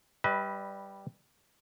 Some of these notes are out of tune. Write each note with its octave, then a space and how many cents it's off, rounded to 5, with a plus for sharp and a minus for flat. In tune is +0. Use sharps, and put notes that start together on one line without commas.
G3 +0 B4 +0 D#5 +45